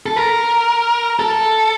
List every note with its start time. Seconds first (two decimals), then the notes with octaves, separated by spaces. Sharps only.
0.06 A4
0.16 A#4
1.19 A4